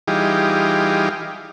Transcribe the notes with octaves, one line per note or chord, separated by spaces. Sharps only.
E3 G3 D#4 F4 G4 G#4